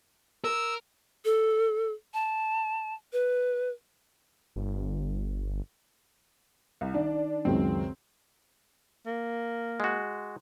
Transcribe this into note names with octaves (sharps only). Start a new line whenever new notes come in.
A#4 E6
A4
A5
B4
G1
C2
D#3 D4
C#2 F#2 D#3 C4
A#3
G#3 F#4